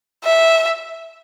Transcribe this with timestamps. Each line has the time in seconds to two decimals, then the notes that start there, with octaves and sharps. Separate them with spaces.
0.24 E5